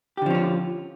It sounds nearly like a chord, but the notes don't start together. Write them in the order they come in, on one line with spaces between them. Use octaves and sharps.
G4 D3 F3 C#4 F4